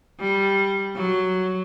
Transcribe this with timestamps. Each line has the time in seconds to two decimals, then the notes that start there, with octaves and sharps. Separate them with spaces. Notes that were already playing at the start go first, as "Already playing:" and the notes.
0.20 G3
0.95 F#3